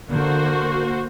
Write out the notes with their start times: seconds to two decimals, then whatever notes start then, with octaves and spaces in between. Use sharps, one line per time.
0.11 D3 A#3 F#4 C5